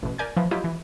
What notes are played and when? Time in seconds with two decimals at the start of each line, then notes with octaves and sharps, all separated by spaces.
0.03 A1 B2
0.18 A#4 D5 G#5 G6 G#6
0.36 E3 F3
0.51 F#3 E4 F4 G4 D#5
0.64 E3